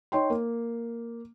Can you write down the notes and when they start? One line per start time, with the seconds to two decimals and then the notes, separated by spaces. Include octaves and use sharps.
0.12 D#4 C#5 G5 C6
0.30 A#3